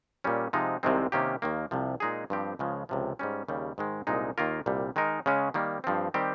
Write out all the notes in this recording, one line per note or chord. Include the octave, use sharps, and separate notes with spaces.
A#2 G3 C#4
C3 F3 G#3 D#4
C2 C3 D#3 G#3 C4
C3 D#3 A#3 C#4 G4
D#2 D#3 A#3
C2 C3 F3
A#2 G#3 D#4 G#4
G2 F3 C4 G4
C#2 C#3 F3 G#3
C#2 C3 F3
G#2 G3 C#4
D#2 C#3 G3
G#2 D#3 G#3
C2 A#2 G#3 D#4
D#2 D#3 A#3 F4 A#4
C2 A#2 G3
D#3 G#3 D#4 A#4
C#3 G#3 C#4
D#3 G3 A#3
G2 F3 C4
D#3 G3 C4 G4